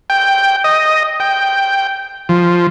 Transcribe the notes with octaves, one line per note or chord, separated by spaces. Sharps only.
G5
D#5
G5
F3